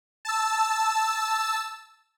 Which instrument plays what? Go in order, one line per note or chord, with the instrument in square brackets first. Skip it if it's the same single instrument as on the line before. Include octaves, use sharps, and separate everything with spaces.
[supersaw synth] A5 E6